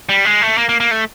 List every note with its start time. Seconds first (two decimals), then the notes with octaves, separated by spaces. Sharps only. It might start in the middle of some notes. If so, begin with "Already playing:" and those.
0.09 G3
0.25 G#3
0.42 A3
0.58 A#3
0.69 A#3
0.80 A#3
0.91 A3